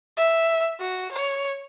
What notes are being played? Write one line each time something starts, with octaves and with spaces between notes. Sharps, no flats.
E5
F#4
C#5